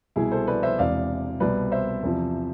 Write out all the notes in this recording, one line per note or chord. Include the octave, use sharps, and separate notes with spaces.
C2 B2 E4 G#4
A4 C5
B4 D5
C5 E5
E1 E2 C3 D5 F5
C2 B2 B4 D5
C5 E5
E2 C3 F3